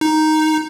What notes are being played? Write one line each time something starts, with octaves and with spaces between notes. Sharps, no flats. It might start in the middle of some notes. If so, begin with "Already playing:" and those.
D#4